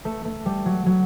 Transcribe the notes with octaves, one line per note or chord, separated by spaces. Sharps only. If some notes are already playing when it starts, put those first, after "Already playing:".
A3
A3
G3
F#3
F#3